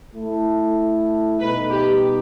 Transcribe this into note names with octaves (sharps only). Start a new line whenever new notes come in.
A3 E4 A4
B2 G3 D#4 B4
G4